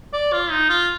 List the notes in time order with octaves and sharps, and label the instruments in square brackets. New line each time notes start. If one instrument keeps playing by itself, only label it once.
[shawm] D5
F4
D#4
F4